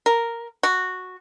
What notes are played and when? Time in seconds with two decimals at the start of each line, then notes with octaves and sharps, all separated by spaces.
0.06 A#4
0.63 F#4